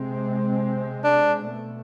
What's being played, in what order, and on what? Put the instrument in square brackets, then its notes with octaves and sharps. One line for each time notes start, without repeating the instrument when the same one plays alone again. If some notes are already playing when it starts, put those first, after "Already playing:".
Already playing: [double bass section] C3 G#3 C4
[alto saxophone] D4
[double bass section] B2 A3